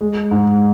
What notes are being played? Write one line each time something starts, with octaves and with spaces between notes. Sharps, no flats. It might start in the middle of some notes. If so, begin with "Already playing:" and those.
G#3
G#2